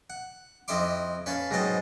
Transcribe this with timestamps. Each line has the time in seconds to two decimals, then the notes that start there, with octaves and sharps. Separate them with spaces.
0.10 F#5
0.68 F2 E4 D#5 E5 C6 D6
1.26 C#4 B4 C#5 F5 A5
1.51 G#2 B2 F#3 C4 D#5 A5